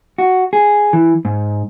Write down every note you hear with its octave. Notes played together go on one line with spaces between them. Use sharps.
F#4
G#4
E3
G#2